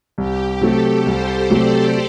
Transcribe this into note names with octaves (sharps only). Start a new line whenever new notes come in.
C2 G4
C3 F#3 A3 A4
C2 C5
C3 F#3 A3 D5